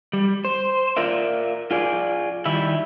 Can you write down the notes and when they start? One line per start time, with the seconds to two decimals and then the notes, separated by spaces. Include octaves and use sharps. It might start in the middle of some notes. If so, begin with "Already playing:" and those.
0.13 G3
0.45 C5
0.97 F4 A#4 D5 E5
1.71 F4 G#4 D5
2.45 D#3 G3 E4 E5